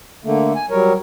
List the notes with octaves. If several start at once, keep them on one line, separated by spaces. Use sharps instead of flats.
D3 A3 A#3
G#5
F#3 G3 A#4 C#5